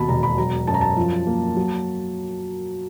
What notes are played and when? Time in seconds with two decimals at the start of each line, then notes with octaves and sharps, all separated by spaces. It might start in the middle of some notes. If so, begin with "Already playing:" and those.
Already playing: D#2 B2 A5 B5
0.09 E1 A#5
0.23 B5
0.38 F#3 A#5
0.67 F#2 A5
0.74 A#5
0.81 A5
0.97 F3
1.27 A#3
1.56 F#3